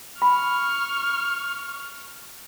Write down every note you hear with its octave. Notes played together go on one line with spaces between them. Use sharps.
B5 C#6 F6